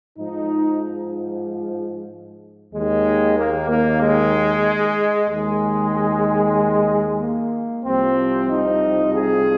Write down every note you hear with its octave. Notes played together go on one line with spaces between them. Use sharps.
G#2 F3 D#4
D#2 D#3 G#3
A#3
A#3
G#3
D#2 D#3 G#3
A#3
C2 C3 F3 C4
D#4
G#4